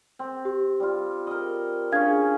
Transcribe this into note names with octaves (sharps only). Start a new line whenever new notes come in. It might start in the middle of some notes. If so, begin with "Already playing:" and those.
C4
G4
G3 F4
A#4 D#5
C#4 D4 G#4 F5 G#6